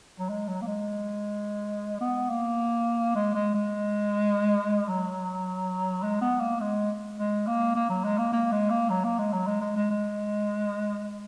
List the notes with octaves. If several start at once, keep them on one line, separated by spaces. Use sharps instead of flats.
F#3
G#3
F#3
A#3
G#3
B3
A#3
G#3
G#3
G#3
F#3
G#3
B3
A#3
G#3
G#3
A#3
A#3
F#3
G#3
A#3
A#3
G#3
A#3
F#3
A#3
G#3
F#3
G#3
G#3
G#3
G#3